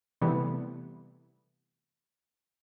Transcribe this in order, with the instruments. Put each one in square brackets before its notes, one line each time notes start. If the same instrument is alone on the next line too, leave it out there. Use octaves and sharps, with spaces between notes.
[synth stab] C3 E3 G3 A3 B3